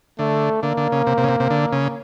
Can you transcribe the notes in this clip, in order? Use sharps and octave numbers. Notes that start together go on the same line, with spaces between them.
D3 A3
D3 A#3
D3
C#3
C3
C3
C#3
C3
C3
D3
C#3